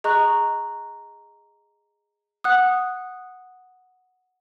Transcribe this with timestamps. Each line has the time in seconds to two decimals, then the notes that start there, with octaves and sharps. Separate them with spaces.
0.04 G#4 D#5 A#5 C#6 F#6
2.44 F#5 D#6 F#6